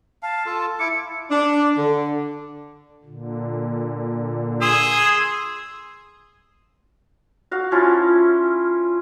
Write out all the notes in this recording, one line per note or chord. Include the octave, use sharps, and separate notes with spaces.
F5 A5
F4 A4
E4 D6 C#7
D4
D3
A#2 D3
G#4 C6 D#6 E6
F#4 F5
F3 C#4 E4 F4